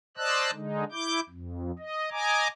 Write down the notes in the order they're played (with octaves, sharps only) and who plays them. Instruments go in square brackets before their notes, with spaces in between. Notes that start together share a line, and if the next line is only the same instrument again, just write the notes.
[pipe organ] C5 D5 D#5 A5 E6 F#6
D3 G#3 D#4
E4 D6 G6
F2
D#5
D#5 G#5 A#5 D6